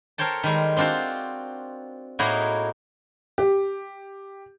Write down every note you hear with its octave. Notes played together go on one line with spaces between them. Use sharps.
A4 A#4 C5 C#5 G5 A5
D#3 G3 G#3
C4 D4 F4 F#4 C5
A2 A#3 D#4 E4 F#4 G#4
G4